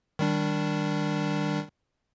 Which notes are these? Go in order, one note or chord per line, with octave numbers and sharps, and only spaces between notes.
D#3 G3 D4